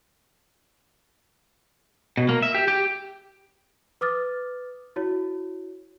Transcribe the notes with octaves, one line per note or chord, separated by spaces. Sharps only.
B2
A#3
E5
G4
G4
B4 D6 D#6 F6 A6
E4 F#4 C#5